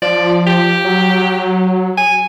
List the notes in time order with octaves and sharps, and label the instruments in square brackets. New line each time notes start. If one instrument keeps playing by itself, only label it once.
[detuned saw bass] F3 [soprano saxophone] D5
[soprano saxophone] G4
[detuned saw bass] F#3
[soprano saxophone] G#5